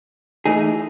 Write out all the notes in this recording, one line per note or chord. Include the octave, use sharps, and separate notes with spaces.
E3 A3 D#4 G#4